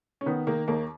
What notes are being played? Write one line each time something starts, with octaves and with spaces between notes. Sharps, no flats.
C#4
D#3 B3
D#3 A#3
D#2 A#3